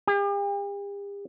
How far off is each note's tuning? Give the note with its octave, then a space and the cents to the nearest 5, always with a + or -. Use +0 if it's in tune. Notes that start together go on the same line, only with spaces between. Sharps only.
G4 +45